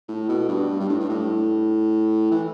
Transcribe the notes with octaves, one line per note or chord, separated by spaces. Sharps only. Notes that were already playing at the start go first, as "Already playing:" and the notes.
A2
B2
G2
G2
A2
G2
A2
E3